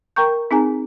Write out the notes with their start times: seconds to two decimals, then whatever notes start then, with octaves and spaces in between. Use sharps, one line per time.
0.16 A#4 G5 A#5 C#6 G6
0.51 C4 D#4 G#4 G#5 A#5